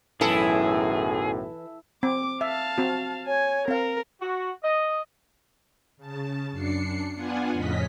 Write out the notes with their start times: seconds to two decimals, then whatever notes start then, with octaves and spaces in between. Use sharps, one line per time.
0.21 B1 F#2 A2 E3 E4 G#4 A4
2.03 C4 D6
2.41 E5 F5 A5
2.78 C4 F#4
3.27 C#5 G#5
3.68 C4 A#4 F5
4.22 F#4
4.64 D#5
5.97 C#3 A5
6.51 F#2 D4 C7 C#7
7.14 B3 D4 F4 F#5 G#5
7.51 F2 A2 C#3 C#4 D#5 B6